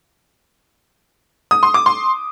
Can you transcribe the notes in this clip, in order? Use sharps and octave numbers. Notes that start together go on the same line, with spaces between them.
D#6
C6
D6
C6